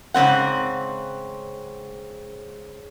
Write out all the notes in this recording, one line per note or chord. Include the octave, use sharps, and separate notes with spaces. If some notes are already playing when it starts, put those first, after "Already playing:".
G#2 C#3 G#3 C4 F#5